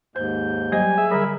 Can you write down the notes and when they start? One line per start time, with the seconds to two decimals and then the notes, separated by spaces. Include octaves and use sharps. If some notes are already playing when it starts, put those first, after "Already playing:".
0.16 D#2 G#2 C5 G6
0.72 F#3 G3 C5 D#5 G#5
0.98 G#4 E5
1.11 D3 G3 A#4 B5